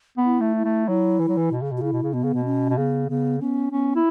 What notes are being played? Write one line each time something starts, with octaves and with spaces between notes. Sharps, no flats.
B3
E4
A3
E4
A3
F#3 E4
E3
F#3
E3
B2
C#3
B2
F#4
C#3 E4
B2
C#3
B2 B3
C#3
B2
C#4
B2
C#3 B3
C#3 B3
B3 C#4
B3 C#4
E4